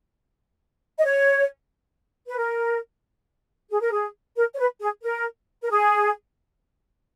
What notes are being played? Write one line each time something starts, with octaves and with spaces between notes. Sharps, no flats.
D#5
C#5
B4
A#4
G#4
A#4
G#4
A#4
C#5
B4
G#4
A#4
A#4
G#4